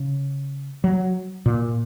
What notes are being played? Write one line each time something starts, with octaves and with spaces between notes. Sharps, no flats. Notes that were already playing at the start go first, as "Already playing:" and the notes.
Already playing: C#3
F#3
A#2